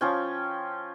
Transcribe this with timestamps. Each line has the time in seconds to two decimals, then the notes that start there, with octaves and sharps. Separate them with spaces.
0.01 F3 C#4 G5